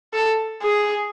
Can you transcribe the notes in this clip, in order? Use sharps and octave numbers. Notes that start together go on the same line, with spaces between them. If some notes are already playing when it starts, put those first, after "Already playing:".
A4
G#4